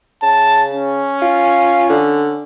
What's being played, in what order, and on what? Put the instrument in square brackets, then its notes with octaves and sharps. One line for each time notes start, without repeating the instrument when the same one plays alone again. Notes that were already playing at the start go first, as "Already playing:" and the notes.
[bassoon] C#3 [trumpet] A5
[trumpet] C#4
[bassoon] F4
D3